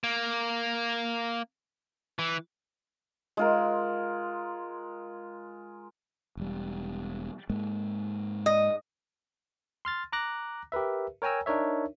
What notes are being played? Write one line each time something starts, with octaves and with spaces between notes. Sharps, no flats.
A#3
E3
G#3 F4 A#4
E1 G3
G#2 G#3 A#3
D#5
C6 F6 A6
A#5 D6 F#6 A#6
G4 A#4 B4 E5
A#4 C#5 G5 G#5 A#5 E6
D4 D#4 A#4 C#5 E5